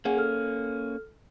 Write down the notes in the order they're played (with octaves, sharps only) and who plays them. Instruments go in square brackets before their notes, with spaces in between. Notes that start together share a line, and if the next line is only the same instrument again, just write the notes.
[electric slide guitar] A#3 C#4 [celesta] G#4 F#5 G#5
[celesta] A4 F6